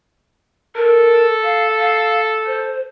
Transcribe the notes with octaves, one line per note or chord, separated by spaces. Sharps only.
A4 A#4
F5
F5
C5